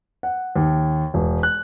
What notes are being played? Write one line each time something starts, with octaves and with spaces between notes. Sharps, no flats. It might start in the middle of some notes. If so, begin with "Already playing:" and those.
F#5
D#2
E1
F#6